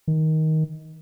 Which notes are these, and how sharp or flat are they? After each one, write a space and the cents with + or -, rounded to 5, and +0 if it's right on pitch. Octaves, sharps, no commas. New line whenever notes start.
D#3 +15